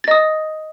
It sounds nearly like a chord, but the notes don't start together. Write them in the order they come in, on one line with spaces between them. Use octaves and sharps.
A6 D#5 D#6